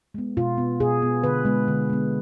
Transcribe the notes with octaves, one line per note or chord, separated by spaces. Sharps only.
G#3 B3
B2 F4
B3
B2 G#4
B3
D3 B4
G#3 B3
D3
G#3 B3